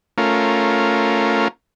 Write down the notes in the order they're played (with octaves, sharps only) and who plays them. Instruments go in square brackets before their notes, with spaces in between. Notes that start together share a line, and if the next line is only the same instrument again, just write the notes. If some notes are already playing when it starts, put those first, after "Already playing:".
[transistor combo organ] A3 C#4 F4 A#4